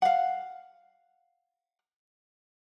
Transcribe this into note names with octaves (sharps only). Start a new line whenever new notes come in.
F5 F#5